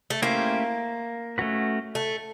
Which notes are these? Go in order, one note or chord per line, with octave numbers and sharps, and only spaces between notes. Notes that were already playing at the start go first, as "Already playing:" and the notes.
A3
A3 A#3 C#4 E4 G4 C5
A3 C#4 F#4 B4
A3